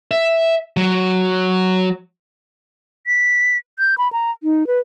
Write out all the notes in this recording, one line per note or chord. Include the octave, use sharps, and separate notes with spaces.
E5
F#3
B6
G6
B5
A#5
D#4
B4